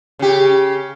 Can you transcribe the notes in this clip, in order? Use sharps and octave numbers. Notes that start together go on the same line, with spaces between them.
C#3 G4